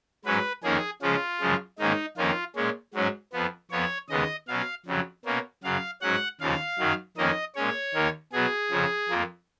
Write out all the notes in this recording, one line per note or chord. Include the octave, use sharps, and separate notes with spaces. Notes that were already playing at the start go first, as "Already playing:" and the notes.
G#2 F#3 C#4 B4
F2 D#3 A#3 C#4 G#4
C#3 F3 G#3 C#4 F4
F#2 C#3 F3 G#3
G#2 D#3 A#3 C#4 D#4
F2 D#3 A#3 C#4 F4
A#2 G#3 C#4
G#2 F#3 C#4
F2 F3 B3
F2 F3 B3 C#5
D#2 C#3 G#3 B3 D#5
B2 F#3 C#4 F5
F2 C#3 F#3
B2 A#3 C#4
F#2 C#3 F#3 F5
G#2 F#3 C#4 F#5
D#2 C#3 F3 F5
F#2 D#3 F#3
F2 D#3 A#3 C#4 D#5
A#2 G#3 C#4 C#5
D#2 D#3 A#3
B2 F#3 B3 G#4
F2 C#3 F3
F2 F3 A#3